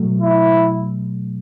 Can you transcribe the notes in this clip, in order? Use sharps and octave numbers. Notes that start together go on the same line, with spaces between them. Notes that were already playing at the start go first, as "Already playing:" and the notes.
Already playing: B2 F#3 A3
E4